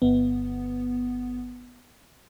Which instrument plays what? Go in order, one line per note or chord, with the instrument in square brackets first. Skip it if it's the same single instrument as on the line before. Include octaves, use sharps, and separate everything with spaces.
[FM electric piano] G1 B3